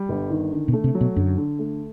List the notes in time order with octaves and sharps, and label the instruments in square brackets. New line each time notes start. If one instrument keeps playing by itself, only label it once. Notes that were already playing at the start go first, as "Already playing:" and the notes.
Already playing: [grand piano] G3
G1
D#3
D3
[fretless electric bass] B2
[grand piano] A3
[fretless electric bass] C3
[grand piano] F#3
[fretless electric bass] B2
[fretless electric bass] F#2 [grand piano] D3
[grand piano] D3
A3